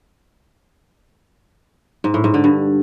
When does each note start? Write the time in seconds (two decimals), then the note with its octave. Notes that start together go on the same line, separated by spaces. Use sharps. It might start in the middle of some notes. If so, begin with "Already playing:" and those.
2.04 G#2
2.14 A2
2.24 G#2
2.34 D3
2.44 G2